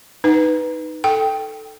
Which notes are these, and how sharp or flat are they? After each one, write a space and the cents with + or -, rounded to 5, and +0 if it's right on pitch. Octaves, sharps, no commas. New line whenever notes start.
D#4 +0 B4 +0
A4 +0 G5 +0